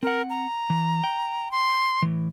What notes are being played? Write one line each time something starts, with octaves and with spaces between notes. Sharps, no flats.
C4 A#4 F#5
A#5
E3
G5
C6
A2 E3